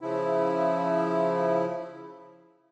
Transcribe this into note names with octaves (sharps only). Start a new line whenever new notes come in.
C#3 F3 E4